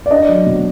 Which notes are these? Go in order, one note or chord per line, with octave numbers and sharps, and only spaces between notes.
D5
D4 D#5
F#3
B2